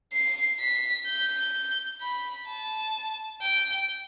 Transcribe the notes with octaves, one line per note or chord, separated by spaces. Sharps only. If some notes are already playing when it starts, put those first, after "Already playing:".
C7
B6
G6
B5
A5
G5